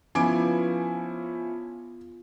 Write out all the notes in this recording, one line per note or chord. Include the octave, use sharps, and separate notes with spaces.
F3 B3 C#4 E4 F4 G#5 D6 D7